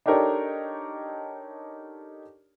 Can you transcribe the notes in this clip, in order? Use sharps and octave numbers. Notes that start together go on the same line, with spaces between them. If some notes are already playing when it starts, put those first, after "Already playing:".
D4 D#4 G4 A4 A#4 C#5